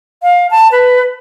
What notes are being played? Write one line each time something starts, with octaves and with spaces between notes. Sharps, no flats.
F5
A5
B4